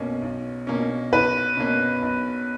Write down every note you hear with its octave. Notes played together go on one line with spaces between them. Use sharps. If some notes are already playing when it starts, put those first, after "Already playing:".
Already playing: B1 B2 A#3 C#4
B1
B2 A#3 C#4
B1 B4
B2 A#3 C#4
B1